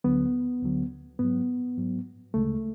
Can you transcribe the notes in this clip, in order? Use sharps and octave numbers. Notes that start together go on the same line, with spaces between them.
D2 D3 F#3 B3
D2 D3 F#3
G#2 F#3 B3
G#2 F#3
D2 C#3 G#3 A3